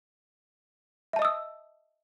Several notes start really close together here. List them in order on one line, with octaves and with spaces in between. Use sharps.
E5 A5 D#5 D#6 E6